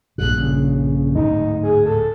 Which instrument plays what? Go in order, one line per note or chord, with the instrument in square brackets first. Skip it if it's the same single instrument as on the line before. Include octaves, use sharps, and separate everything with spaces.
[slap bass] A#1 G2 A#2 [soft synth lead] F#6
[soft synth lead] C#3
[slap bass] D1 G#2 [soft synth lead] D#4
[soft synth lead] G#4
A4